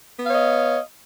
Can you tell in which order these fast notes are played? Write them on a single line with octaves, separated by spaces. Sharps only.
B3 F5 C#5 D#5